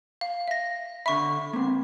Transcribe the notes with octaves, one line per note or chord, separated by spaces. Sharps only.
F5
E5 A#6
D3 E5 B5 C#6
A#3 C4